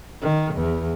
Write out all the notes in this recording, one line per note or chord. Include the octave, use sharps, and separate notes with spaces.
D#3
E2